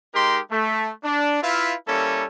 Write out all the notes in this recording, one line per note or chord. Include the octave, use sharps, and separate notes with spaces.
G#3 D#4 G4 A#4 C6
A3
D4
E4 F4 B4 E5 F5
G3 A#3 C#4 E4 A4